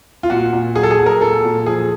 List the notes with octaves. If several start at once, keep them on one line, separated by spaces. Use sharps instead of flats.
F4
A#2 F#4
A#2
F#3 G#4
A4
G#4
F#3
A#4
A#2 A4
A#2
F3 G#4